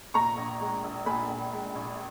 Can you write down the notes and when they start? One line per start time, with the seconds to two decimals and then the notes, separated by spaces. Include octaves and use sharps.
0.14 A#2 A#5 C#6
0.38 A#1
0.61 G#3
0.84 A#1
1.06 A#2 G#5 B5
1.29 A#1
1.53 G#3
1.75 A#1